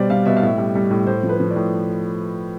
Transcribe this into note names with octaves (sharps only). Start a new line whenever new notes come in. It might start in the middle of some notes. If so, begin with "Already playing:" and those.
Already playing: B2 G3 C5 D5
G3 F5
B2 E5
F5
A2 E5
G3
G3
A2
A2 C5
F3
B4
F3
D5
A2